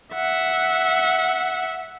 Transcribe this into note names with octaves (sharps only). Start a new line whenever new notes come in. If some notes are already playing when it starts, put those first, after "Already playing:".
E5 F#5